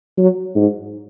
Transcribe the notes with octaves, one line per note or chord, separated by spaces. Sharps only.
F#3
G#2